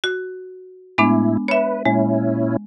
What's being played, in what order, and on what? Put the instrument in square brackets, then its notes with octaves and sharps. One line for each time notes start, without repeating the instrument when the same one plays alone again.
[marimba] F#4
[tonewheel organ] A2 E4 [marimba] G#3 B3 D4
[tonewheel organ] B4 [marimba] C#5 E5
[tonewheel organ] A#2 C#4 E4 [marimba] G#3